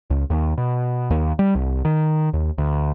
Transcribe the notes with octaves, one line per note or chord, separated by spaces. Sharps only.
C#2
D#2
B2
D#2
G3
C2
D#3
D#2
D2